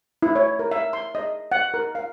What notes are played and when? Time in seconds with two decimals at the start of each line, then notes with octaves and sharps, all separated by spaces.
0.23 E4
0.36 C#5
0.59 A#4
0.71 E5
0.93 C6
1.15 D#5
1.52 F#5
1.74 A#4
1.95 F5